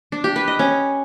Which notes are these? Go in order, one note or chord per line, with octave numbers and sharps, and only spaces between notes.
D4
G4
B4
D#5
C#4